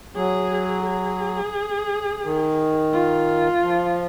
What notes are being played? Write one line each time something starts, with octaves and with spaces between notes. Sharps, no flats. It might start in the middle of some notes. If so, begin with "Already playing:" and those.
F#3 G#4
G#4
D#3
F4
F3